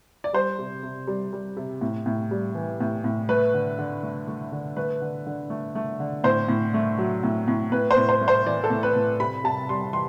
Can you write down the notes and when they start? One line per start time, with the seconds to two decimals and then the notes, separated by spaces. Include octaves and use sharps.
0.24 D5
0.33 G3 C5
0.58 C3
0.83 C3
1.07 G3
1.33 G3
1.57 C3
1.81 A2
2.06 A2
2.31 G3
2.55 E3
2.81 A2
3.04 A2
3.29 A3 B4
3.54 D3
3.78 D3
4.03 A3
4.28 A3
4.52 D3
4.77 A3 B4
5.02 D3
5.27 D3
5.50 A3
5.75 A3
6.00 D3
6.24 A2 C5
6.48 A2
6.74 A3
6.98 F#3
7.23 A2
7.48 A2
7.72 A2 B4
7.91 C5
7.97 A2
8.09 C5
8.21 A3
8.28 C5
8.46 E3 D5
8.64 A4
8.70 A2
8.83 B4
8.96 A2
9.20 C3 B5
9.44 C3 A5
9.69 G3 C6
9.93 E3 C6